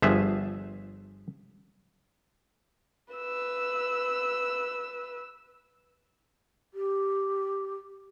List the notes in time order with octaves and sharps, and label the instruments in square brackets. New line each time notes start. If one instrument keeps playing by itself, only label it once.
[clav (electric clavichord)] G1 F3 G#4 E5
[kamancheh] B4 E6
[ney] G4